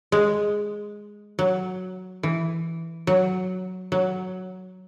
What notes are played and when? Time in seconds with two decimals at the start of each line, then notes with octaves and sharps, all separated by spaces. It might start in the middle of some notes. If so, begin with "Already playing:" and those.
0.12 G#3
1.39 F#3
2.23 E3
3.07 F#3
3.92 F#3